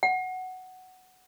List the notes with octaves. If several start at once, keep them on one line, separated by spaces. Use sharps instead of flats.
F#5